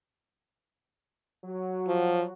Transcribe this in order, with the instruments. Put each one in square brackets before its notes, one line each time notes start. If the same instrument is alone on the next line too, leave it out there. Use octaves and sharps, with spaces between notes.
[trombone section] F#3 F#4
[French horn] F3